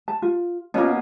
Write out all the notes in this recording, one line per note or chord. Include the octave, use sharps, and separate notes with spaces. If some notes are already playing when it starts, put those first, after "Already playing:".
A5
F4
B2 A#3 C#4 F4